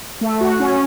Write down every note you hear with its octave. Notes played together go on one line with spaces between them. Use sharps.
A3
F#4
C#4